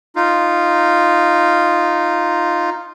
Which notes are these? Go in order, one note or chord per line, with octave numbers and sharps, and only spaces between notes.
D#4 F4